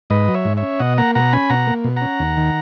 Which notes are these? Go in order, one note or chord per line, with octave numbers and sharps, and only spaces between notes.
G#2 B4 D#5
F#3
C#5 E5
G#2
C#5 E5
C#4
B2 D#5 F#5
A#3 F#5 A#5
B2 F#5 A#5
C#4 G#5 B5
B2 F#5 A#5
A#3
B2
C#4 F#5 A#5
D#2
D#3